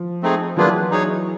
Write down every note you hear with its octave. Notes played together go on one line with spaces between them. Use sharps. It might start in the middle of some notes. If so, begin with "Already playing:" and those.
Already playing: F3
A3 C4 D#4 G#4
E3 F#3 A#3 D4 F4 G#4 B4
D#4 G#4 C#5